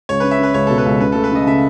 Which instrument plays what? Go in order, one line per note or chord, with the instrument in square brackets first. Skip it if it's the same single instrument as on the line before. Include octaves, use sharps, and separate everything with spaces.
[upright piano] C#2 [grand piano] C#5
[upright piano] C#4 [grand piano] B4
[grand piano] E5
[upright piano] C#4 [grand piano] B4
[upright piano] C#2 [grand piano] C#5
[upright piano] B2 [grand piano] A4
[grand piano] B4
[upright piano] C#2
[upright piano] C#3 [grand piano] B4
[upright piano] A3 [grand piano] A4
[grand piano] B4
[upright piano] C#3 [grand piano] D#5
[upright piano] C#3 [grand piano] E5